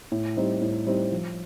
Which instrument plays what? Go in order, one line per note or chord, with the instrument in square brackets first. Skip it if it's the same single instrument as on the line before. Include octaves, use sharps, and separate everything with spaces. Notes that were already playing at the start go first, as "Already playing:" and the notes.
[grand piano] A2
G3 C4 D#4
A2
G3 C4 D#4
F3